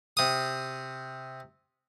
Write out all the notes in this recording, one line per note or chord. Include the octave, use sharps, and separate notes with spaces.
C3 D#6